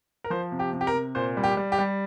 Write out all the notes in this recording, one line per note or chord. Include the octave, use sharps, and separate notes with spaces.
A#4
F3 C5
C3
G4
C3
G4
A#4
C3
A#2 C5
G3
G4
G3
G4
G3